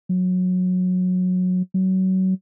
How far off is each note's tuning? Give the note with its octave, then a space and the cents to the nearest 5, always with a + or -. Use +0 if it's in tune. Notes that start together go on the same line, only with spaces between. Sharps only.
F#3 -20
F#3 +25